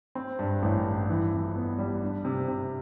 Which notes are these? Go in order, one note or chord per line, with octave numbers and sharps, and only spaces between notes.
C4
G2
A1
G2
E3
F2
B3
G3
D4
C3
C3